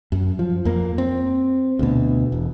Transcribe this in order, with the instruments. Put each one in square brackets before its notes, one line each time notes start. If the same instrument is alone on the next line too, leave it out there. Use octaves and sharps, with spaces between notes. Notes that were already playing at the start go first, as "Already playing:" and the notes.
[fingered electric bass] F#2
F3
F2 A#3
C4
D2 B2
E1